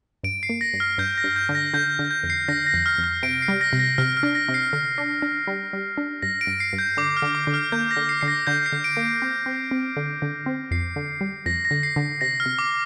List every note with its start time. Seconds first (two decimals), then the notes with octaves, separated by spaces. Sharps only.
0.23 G2 D7
0.43 C7
0.49 A#3
0.61 A#6
0.74 G2
0.80 F6
0.98 G2 G6
1.18 A#6
1.24 G2
1.36 G6
1.49 D3
1.55 A#6
1.74 D3 G6
1.99 D3
2.11 G6
2.23 F2
2.30 C7
2.48 D3 A#6
2.66 A#6
2.74 F2
2.86 F6
2.98 F2
3.04 F6
3.23 C3 D7
3.42 C7
3.48 G3
3.61 A#6
3.73 C3
3.79 A#6
3.98 C3 F6
4.17 F6
4.23 D4
4.35 A#6
4.48 C3
4.54 C7
4.73 D3
4.98 D4
5.22 D4
5.47 G3
5.73 G3
5.98 D4
6.22 G2 A#6
6.41 D7
6.47 G2
6.60 C7
6.73 G2
6.78 G6
6.97 D3 D6
7.17 F6
7.22 D3
7.35 D6
7.47 D3
7.54 F6
7.72 A#3 G6
7.91 A#6
7.97 D3
8.09 C7
8.21 D3 C7
8.28 A#6
8.47 D3 G6
8.66 C7
8.72 D3
8.84 D7
8.97 A#3
9.22 C4
9.46 C4
9.71 C4
9.97 D3
10.22 D3
10.46 C4
10.71 F2 C7
10.96 D3
11.21 G3
11.46 F2 A#6
11.65 A#6
11.71 D3
11.83 C7
11.96 D3
12.21 C3 A#6
12.40 F6
12.46 C3
12.59 D6